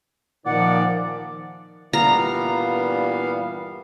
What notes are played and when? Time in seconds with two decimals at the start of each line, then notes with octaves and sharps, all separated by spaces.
0.46 A#2 D#3 F3 D5 F#5
1.93 G2 A#2 E3 G3 B3 F5 A#5